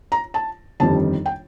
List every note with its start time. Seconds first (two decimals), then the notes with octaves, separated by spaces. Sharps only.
0.12 A#5
0.34 A5
0.80 G1 F2 D#3 G3 A5
1.26 G5